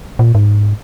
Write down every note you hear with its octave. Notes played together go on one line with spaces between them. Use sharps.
A#2
G#2